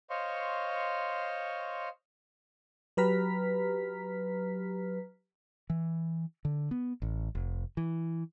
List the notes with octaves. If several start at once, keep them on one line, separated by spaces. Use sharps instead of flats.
C5 C#5 D#5 F5 C6 C#6
F#3 G4 B4 A#5 F6 B6
E3
D3
B3
A1
F1
E3